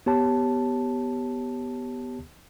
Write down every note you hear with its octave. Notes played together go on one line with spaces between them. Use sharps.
B3 G4 C#5 A5